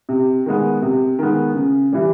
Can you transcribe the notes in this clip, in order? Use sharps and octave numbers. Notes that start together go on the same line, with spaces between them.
C3
D#3 G#3 B3
C3
D#3 G#3 B3
C#3
E3 G3